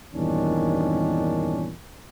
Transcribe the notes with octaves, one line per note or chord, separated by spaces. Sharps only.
E2 G2 A#2 D#3 C#4 D4